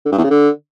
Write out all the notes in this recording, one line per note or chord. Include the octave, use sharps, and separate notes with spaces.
D3
G2
E2
C#3
D3